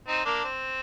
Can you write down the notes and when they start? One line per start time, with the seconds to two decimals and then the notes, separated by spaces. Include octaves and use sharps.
0.08 C4 D#4
0.25 A#3 D4
0.44 C4